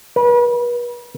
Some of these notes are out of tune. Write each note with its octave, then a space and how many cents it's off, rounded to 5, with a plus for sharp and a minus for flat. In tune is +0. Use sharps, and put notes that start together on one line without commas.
B4 -40